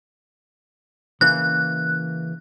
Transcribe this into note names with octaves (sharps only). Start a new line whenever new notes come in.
C#3 E3 A#3 F#6